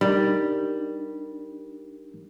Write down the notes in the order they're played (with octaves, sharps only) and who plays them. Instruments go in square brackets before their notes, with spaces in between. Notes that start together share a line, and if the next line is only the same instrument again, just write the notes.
[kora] G3 [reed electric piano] D4 D#4 A#4